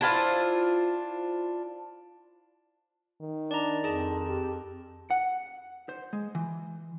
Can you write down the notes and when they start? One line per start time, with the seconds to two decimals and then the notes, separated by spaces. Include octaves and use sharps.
0.01 D4 E4 F4 C5
3.21 D#3
3.51 D4 D5 A#5
3.84 F2 G#4 A5
4.29 G4
5.10 F#5
5.89 C5
6.13 G#3
6.35 E3